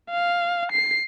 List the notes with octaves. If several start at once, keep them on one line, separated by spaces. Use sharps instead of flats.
F5
C7